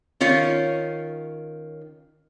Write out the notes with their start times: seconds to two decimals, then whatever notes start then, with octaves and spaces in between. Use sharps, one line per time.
0.20 D#3 C#4 F4 C#5